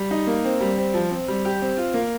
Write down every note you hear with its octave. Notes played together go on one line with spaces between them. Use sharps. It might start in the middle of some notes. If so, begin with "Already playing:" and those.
Already playing: G3
D#4
A#3
C4
G3
C4
F3
C4
G3
G4
C4
F4
A#3